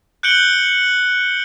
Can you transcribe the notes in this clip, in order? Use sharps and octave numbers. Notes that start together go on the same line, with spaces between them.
F#6 G6 C#7 D7 F#7 G7